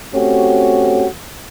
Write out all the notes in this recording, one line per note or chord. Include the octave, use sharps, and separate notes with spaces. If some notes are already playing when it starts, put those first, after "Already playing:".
A3 C4 C#4 F#4 G4